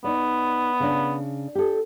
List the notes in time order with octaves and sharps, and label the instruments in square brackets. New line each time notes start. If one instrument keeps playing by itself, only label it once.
[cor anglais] B3 [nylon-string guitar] D#4 D5
[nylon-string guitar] C#3 D4
G4 A4